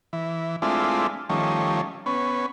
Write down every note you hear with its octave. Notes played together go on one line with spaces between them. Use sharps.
E3
G#3 A3 C4 D4 E4 F4
D#3 F3 G3 A3 C#4
B3 C#4